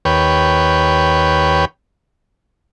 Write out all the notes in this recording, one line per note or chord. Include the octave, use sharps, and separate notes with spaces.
D#2 B4 C#5 G5